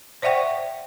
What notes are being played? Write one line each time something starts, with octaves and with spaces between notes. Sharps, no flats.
C5 D5 E5 F#5 G5 C#6